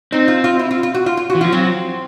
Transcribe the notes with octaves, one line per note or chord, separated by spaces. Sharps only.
C4 D#4
F4
F4
E4
F4
F4
F#4
F4
F4
F#4
E3
F3 F4
F#3 C4